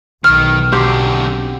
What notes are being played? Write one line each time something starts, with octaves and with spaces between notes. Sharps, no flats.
B1 D#3 F6
D3 F#3 C4 G4